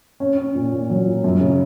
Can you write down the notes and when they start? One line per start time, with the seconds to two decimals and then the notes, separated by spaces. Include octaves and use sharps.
0.20 C#4
0.38 C#4
0.55 A#2
0.72 A#2
0.90 F#3
1.07 A#2
1.24 F#2
1.41 C#3